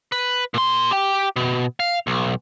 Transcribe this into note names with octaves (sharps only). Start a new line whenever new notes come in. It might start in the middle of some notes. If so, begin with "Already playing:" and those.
B4
A#2 C6
G4 G5
B2
F5
B1